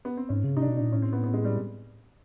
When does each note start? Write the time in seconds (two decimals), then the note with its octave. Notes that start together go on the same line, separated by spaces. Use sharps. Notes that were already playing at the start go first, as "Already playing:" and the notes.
0.05 B3
0.17 C4
0.29 G#2 C#4
0.44 C#3
0.56 C3 D#4
0.61 D4
0.67 B2
0.77 A#2 D4
0.92 A2 C#4
1.02 C4
1.13 B3
1.24 B3
1.34 G#3
1.45 G3